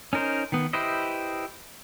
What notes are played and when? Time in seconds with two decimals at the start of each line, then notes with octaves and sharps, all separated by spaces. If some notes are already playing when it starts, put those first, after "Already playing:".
0.13 C#4 D#4 A#4 C5
0.52 D#3 B3
0.73 E4 G4 B4 C5 D#5